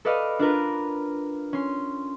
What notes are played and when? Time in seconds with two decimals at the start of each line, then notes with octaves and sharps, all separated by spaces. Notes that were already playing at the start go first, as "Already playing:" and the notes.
0.05 A4 B4 D5 D#5 F5
0.39 D4 F4 A#4 B4
1.53 C#4 C6